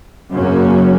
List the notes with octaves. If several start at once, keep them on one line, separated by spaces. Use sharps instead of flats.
F#2 C#3 F#3 A#3 C#4